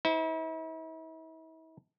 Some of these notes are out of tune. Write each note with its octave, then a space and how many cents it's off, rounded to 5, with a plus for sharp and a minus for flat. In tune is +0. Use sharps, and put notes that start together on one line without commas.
E4 -45 C5 -15